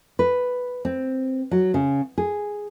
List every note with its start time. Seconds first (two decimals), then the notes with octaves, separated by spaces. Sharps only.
0.19 B4
0.85 C4
1.51 F#3
1.74 C#3
2.18 G#4